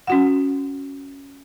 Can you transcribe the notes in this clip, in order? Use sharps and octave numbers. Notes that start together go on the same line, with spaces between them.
C#4 F#4 F#5